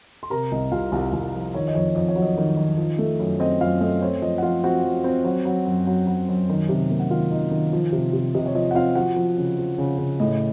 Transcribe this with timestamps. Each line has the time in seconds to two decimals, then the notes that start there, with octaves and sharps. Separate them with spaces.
0.23 C6
0.30 C3 A#4 A#5
0.52 C2 D#5
0.72 C2 F4 F5
0.92 C2
1.13 C2
1.34 F3
1.54 D#3 C#5
1.68 D#5
1.75 F2 C#5
1.95 F2 D#5
2.09 C#5
2.16 F#3
2.22 D#5
2.37 D#3
2.57 D#3
2.77 F3
2.98 A3
3.20 F#2
3.40 C4 D#5
3.61 F#2 F4 F5
3.80 A3 D#5
4.01 C4 C#5
4.22 F3 D#5
4.38 F#5
4.42 F3 F4 F5
4.64 C4 F#4 F#5
4.84 F3
5.04 C4
5.25 F#3
5.45 F#3
5.66 F#2
5.87 F#3
6.07 F#3
6.28 F#2
6.49 D#3
6.69 C3
6.90 A#3
7.00 F#5
7.10 D#3 F4 F5
7.31 D#4
7.51 D#3
7.73 F3
7.92 C3
8.13 C3
8.34 C3 D#5
8.46 C#5
8.55 F3 D#5
8.71 F#5
8.75 C4 F4 F5
8.95 F3 F#4 F#5
9.16 F3
9.38 C#3
9.58 F3
9.78 C#3
9.98 C#3
10.20 A2 D#5